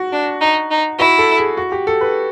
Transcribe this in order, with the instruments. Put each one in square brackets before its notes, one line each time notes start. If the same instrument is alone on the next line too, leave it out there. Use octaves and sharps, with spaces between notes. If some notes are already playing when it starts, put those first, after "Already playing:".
Already playing: [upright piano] F#4
[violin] D4
D#4
D#4
[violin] E4 [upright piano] F#4
[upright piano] A4
G#4
F#4
G4
A4
B4